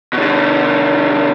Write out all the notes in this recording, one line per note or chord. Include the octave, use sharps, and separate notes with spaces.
B2 D3